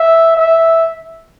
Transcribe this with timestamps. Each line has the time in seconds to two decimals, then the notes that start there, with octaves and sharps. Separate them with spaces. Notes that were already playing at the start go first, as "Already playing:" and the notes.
Already playing: E5
0.37 E5